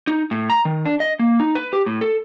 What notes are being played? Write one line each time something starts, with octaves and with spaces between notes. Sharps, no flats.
D#4
A2
A#5
D#3
D4
D#5
A#3
D#4
B4
G4
A2
A4